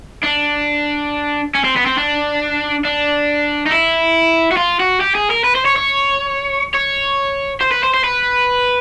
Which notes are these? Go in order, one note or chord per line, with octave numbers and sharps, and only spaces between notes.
D4
C#4
C4
B3
C4
D4
D4
D#4
E4
F#4
F4
F#4
G4
G#4
A#4
B4
C5
C#5
C#5
C#5
C5
B4
C5
C5
B4